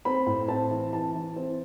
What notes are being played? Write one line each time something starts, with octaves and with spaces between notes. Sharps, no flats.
C4 B5
A2
C4 A5
E3
E3 A5
E3
C4